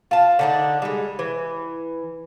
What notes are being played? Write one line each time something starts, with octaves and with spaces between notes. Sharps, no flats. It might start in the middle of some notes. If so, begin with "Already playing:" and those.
F4 A5
D3 D4 D#4
G3 G#3
E3